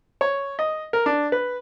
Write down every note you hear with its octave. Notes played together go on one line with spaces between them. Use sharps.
C#5
D#5
A#4
D4
B4